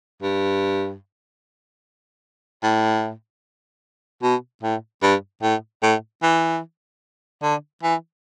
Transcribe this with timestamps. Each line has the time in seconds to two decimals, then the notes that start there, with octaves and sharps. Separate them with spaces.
0.22 G2
2.63 A2
4.23 B2
4.63 A2
5.02 G2
5.42 A2
5.83 A2
6.23 E3
7.42 D3
7.83 E3